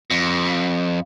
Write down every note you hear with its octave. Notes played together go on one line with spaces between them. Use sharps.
F2